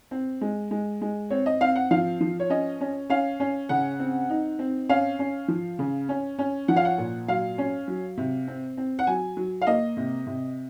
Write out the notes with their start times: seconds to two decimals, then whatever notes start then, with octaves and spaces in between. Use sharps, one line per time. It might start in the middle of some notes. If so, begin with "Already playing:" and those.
0.11 C4
0.41 G#3
0.71 G#3
1.01 G#3
1.30 C4 C#5
1.46 D#5
1.61 C4 F5
1.75 F#5
1.91 F3 F5
2.21 F3
2.40 C#5
2.50 C#4 D#5
2.81 C#4
3.10 C#4 F5
3.40 C#4
3.69 C#3 F#5
4.00 C4
4.30 D#4
4.59 C4
4.89 C#4 F5
5.19 C#4
5.48 F3
5.79 C#3
6.09 C#4
6.39 C#4
6.68 F3 F#5
6.76 F5
6.85 F#5
6.98 A#2
7.28 F#3 F5
7.58 C#4
7.88 F#3
8.18 C3
8.48 C4
8.77 C4
8.99 F#5
9.07 F#3 G#5
9.37 F#3
9.62 F5
9.67 A#3 D#5
9.97 C3
10.27 C3